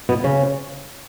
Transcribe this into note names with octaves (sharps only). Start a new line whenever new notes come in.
B2 B3
C#3 C#4